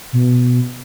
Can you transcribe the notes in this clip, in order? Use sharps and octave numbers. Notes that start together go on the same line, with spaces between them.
B2